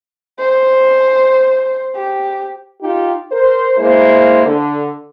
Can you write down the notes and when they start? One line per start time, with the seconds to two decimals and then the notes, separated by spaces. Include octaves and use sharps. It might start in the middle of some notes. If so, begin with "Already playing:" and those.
0.39 C5
1.95 G4
2.82 D#4 F4 G4
3.32 A#4 C5
3.78 G#3 A#3 E4 C5
4.46 D3